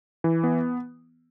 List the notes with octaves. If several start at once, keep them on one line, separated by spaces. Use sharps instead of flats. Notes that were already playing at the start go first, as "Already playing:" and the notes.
E3
B3